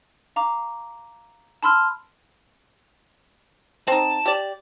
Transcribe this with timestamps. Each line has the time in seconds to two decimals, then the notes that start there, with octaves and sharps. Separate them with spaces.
0.36 F5 A#5 D6
1.63 A5 B5 C6 E6 F6
3.88 C4 D#4 A5
4.26 G4 D5